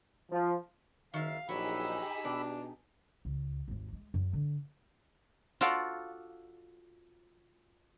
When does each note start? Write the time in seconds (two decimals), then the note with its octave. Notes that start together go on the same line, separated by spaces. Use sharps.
0.30 F3
1.14 F#1 D#3 E5 F5
1.49 A#1 F#3 D#4 G4 G#4 B5 E6
2.25 B2 D4
3.25 C#2
3.68 G#1 D#2
3.93 G#3
4.14 F#2
4.33 D3
5.61 F4 F#4 A4 D5 F5